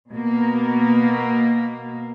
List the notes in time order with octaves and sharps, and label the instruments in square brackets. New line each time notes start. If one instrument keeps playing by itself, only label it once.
[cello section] B2 A#3